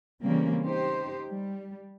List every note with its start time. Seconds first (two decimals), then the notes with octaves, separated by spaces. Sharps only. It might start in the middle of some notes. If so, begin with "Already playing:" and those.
0.22 C#3 E3 G3 A#3 C4 C#4
0.64 D#4 G4 C5
1.28 G3